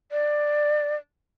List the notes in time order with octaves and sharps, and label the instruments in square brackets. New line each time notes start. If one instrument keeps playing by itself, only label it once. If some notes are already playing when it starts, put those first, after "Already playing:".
[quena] D5